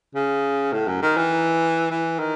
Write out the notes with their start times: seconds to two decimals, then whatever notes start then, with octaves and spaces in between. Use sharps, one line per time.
0.15 C#3
0.72 A2
0.88 F#2
1.02 D#3
1.17 E3
1.91 E3
2.19 D#3